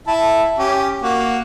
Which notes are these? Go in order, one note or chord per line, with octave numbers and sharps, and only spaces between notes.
E4 E5 A5
C#4 G4
A#3 F#4